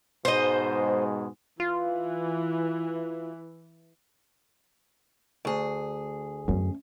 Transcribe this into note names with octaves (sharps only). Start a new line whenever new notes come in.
G#2 B2 G#3 C5 D#5
E3 F4
D2 G#4
F#2 A3 C#4